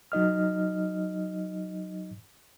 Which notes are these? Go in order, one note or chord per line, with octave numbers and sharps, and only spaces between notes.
F#3 D#4 D#5 F6